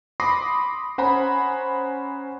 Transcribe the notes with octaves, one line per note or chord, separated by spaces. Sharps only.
B5 C6 D6 D#6 A#6 C7
C#4 C5 F#5 G#5 A#5 B5